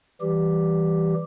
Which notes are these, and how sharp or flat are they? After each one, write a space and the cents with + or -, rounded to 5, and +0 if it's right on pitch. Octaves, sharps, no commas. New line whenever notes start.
E3 +0 G3 +0 G4 +0